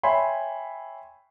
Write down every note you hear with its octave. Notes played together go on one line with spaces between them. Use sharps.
C#5 E5 G5 G#5 B5 C6